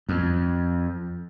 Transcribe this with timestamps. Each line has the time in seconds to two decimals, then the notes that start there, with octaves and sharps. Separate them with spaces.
0.09 F2